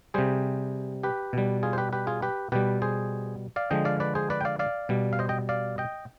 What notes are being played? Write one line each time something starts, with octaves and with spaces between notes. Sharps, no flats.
C3 G3 G#4 C5
G4 B4
B2 G3
F4 G#4
C5
G4 B4
G4 B4
F4 G#4
G4 B4
B2 G3 G4 B4
G#4 C5
D5 F5
D3 F3 G#3 D#5 G5
D5 F5
B4 D5
G#4 C5
B4 D5
G5
D5 F5
D5 F5
B2 G3
F5
C5 D#5
D#5 G5
D5 F5
D#5 G5